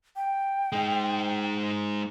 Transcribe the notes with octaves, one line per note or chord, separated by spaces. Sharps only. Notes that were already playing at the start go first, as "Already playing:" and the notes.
G5
G#3 D#4